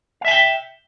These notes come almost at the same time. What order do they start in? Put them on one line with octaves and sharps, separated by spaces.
F5 E5 G#5 G5